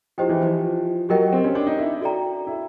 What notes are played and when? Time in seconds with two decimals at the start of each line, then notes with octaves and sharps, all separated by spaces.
0.18 F3 E4 G4 C5 D#5 G5
0.29 E3
0.41 F3
1.09 F#3 G4 A#4 D#5 G5
1.33 C4
1.44 C#4
1.55 D4
1.67 D#4
1.78 E4
2.01 F#4 A4 D5 G5 A#5
2.47 E4